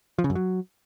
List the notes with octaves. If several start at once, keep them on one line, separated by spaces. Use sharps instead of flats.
F3
C#3
F#2
F#3